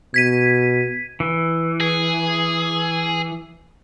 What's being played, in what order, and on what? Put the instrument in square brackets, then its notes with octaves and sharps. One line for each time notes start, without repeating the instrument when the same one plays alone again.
[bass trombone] B2 [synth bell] G#6 B6 D#7
[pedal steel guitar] E3
[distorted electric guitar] G#4